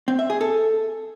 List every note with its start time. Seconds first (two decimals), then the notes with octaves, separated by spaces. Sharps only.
0.08 C4
0.19 E5
0.30 G#4
0.41 A4